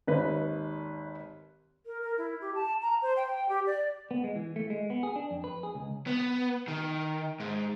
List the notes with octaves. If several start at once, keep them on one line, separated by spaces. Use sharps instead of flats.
G#1 D#2 B4 C#5
A#4
A#4
E4
G4
A5
A#5
C5
G5
G4
D5
B3
G#3
E3
A3
G#3
B3
G#4
D4
F2
B4
G#4
C#2
B3
D#3
G#2